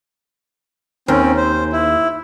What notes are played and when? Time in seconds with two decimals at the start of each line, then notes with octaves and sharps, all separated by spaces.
1.08 D#2 C4 C#4
1.37 C5
1.72 E4